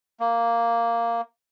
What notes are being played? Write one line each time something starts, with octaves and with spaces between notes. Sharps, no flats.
A#3